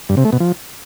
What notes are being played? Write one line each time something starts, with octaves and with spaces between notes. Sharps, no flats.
G2
C3
A3
B2
F3